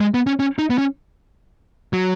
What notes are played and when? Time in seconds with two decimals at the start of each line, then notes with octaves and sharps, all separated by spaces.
0.01 G#3
0.14 B3
0.27 C#4
0.39 C#4
0.59 D#4
0.70 B3
0.78 C#4
1.93 F#3